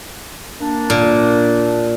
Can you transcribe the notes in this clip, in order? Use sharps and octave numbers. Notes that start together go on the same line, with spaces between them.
A#3 D4
A#2